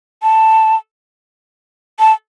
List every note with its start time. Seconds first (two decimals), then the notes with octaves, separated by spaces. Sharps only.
0.23 A5
1.99 A5